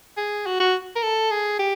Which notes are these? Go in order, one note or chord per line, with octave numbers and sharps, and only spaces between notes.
G#4
F#4
F#4
A#4
A4
G#4
G4